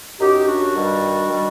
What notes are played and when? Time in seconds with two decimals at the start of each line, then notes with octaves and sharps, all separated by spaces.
0.20 F#2 F#3 D#4 G4
0.46 D4 F#4
0.73 G2 D#3 G3
1.28 D#3 G3